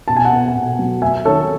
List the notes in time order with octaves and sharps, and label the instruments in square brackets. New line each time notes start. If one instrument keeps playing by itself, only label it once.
[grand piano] B2 A5
G#5
F#5 A5
B3
B2
F#3
A3 E5 G#5
D#3 A4 C#5